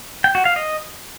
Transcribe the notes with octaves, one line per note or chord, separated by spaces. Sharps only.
G5
F#4
F5
D#5